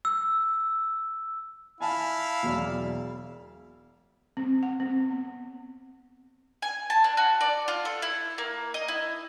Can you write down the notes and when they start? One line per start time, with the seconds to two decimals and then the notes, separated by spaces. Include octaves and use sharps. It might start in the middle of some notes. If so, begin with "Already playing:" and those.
0.05 E6
1.81 E4 F5 G#5 A5
2.43 E1 F#3 D5
4.37 C4
4.63 F#5
4.80 C4
5.11 B3
6.62 G#5
6.90 A5
7.04 D4
7.17 F#4
7.41 D5
7.68 F4
7.85 A4
8.02 E4
8.38 A#3
8.74 D#5
8.88 E4